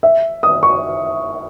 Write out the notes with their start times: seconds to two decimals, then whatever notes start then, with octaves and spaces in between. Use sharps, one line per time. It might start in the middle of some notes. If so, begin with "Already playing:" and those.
0.03 E5
0.43 D#6
0.63 C#6